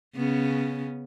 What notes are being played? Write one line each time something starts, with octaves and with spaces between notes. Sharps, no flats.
C#3 B3 C#4